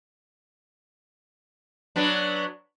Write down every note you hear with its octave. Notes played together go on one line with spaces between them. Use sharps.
F#3 B3 D4